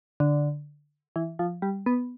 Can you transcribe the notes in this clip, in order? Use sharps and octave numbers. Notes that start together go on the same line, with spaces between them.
D3
E3
F3
G3
B3